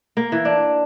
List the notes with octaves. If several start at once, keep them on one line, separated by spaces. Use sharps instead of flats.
A#3
E3
D4